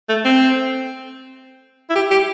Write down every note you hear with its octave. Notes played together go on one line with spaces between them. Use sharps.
A3
C4
E4
G4
G4